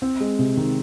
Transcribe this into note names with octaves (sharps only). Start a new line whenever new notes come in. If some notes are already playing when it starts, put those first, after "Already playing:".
C4
G#3
C3
D#3